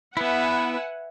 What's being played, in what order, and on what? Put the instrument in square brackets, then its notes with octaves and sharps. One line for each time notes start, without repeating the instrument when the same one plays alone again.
[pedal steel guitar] B3 E4 [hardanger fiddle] B4 E5 [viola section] F#5 G#5